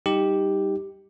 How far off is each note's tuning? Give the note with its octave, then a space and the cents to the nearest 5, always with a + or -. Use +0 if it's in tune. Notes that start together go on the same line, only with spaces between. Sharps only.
G3 -5 D#4 +0 G4 +0